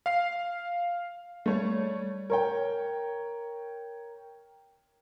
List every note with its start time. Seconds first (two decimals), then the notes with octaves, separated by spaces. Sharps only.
0.06 F5 C7
1.46 G3 A3 C#5
2.30 A#4 C#5 G5